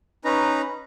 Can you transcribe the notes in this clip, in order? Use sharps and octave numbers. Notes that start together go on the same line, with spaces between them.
C#4 D#4 B4 A#5